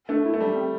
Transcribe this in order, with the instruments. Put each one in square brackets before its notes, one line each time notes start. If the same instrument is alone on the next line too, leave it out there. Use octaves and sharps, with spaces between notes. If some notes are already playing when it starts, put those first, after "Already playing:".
[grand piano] A3 [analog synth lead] D4
[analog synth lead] E4
[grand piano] A3
[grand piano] G3 [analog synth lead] D4
[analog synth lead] C4